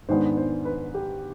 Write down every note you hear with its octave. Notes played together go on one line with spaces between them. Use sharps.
G#2 D#3 G#3 B3 D4 C5
C5
B4
G4